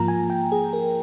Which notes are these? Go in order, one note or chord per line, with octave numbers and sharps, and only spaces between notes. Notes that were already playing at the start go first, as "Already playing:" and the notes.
Already playing: G#2 F3 A#3 F4 A#5
G#5
G5
G#4
A#4